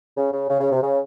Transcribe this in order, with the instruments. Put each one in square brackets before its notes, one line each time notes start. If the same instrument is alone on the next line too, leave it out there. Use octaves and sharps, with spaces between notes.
[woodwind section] C#3
C#3
C#3
C#3
C3
C#3